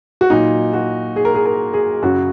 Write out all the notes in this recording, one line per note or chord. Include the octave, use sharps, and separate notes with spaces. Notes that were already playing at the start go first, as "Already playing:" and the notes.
F#4
A#2 F#3 D#4
F#4
G#4
A#4
G#4
A#4
G#4
F#2 C#3 F#3 F#4